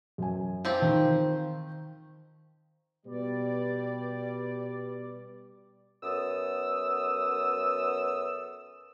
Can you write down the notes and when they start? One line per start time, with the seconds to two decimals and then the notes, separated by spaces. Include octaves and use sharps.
0.18 F#2 G#5
0.65 F3 C4 G4
0.82 D#3
3.06 B2 G3 G4 B4 D5
6.03 F#2 B3 A4 D#6 E6